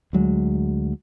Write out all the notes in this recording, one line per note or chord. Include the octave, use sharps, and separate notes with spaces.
D2 F#3 G#3